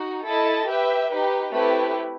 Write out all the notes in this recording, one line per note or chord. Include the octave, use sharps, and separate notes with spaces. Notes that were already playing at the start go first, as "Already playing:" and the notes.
Already playing: D#4 F#4
E4 A4 D#5 A5
G4 B4 E5 G5
D#4 G4 B4
A3 C4 E4 G4 B4